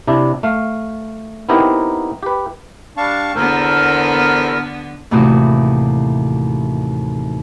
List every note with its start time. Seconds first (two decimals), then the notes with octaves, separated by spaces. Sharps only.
0.08 C3 D4 E4
0.43 A3 F5
1.49 B3 C4 D#4 E4 G4 A#4
2.23 G4 B4
2.97 G3 D4 F5 A5 C#6
3.35 E2 D3 B3 A4 A#4 C5
5.11 D#2 A2 C3 E3 F#4 D#6